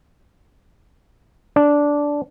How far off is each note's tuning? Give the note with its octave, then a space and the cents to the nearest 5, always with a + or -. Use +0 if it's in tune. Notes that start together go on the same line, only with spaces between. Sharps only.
D4 -10